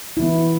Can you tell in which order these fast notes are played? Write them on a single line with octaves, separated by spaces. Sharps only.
E4 E3 B3